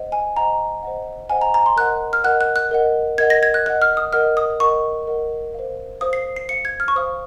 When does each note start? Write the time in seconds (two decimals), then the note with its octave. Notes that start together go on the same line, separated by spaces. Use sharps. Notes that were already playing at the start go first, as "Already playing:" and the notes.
Already playing: C5 D#5 F#5
0.12 G#5
0.36 C5 D#5 F#5 A#5
0.83 C5 D#5 F#5
1.30 C5 D#5 F#5 G#5
1.41 A#5
1.54 A#5
1.66 C6
1.77 A#4 D#5 F#5 F#6
2.13 F6
2.24 A#4 D#5 F#5 F#6
2.41 F#6
2.56 F#6
2.71 A#4 D#5 F#5
3.18 A#4 D#5 F#5 G#6
3.30 A#6
3.43 G#6
3.54 F#6
3.66 A#4 D#5 F#5 F#6
3.82 F6
3.97 D#6
4.13 A#4 D#5 F#5 F6
4.37 D#6
4.60 A#4 D#5 F#5 C#6
5.07 A#4 D#5 F#5
5.54 C5 F5
6.01 C5 F5 D#6
6.13 C7
6.36 C7
6.49 C5 F5 C#7
6.65 G#6
6.80 F6
6.88 C#6
6.95 C5 F5 D#6